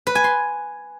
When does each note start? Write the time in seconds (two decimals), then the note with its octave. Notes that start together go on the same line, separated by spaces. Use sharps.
0.07 B4
0.15 G#5
0.24 C6